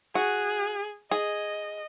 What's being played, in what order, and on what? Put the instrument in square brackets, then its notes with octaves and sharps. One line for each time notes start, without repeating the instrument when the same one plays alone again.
[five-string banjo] F#4 [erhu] G#4
[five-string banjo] G#4 [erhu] D#5